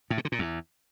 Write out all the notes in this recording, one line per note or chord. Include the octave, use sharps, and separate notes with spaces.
A2
B2
D3
A#2
E2